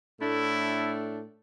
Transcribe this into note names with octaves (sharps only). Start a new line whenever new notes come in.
A2 A3 D4 E4